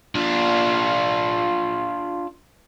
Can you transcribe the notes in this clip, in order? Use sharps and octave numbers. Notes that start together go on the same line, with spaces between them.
D4 F4